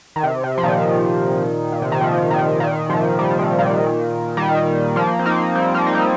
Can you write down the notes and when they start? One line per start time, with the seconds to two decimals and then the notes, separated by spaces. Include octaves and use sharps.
0.16 D#3
0.24 C3
0.44 C3
0.58 F3
0.63 A#2 D#3
1.72 A#2
1.82 C3
1.92 D#3
2.01 C3 F3
2.30 A#2 D#3
2.60 A#2 D#3
2.89 C3 F3
3.19 D#3 G3
3.38 C3 F3
3.58 A#2 D#3
4.37 D#3 G3
4.96 F3 A#3
5.19 C4
5.26 A#3 D#4
5.55 G3 C4
5.75 F3 A#3
5.86 D#4
5.95 G3 C4